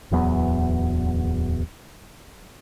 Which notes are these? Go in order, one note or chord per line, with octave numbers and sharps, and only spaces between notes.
D1 E2 F#3 B3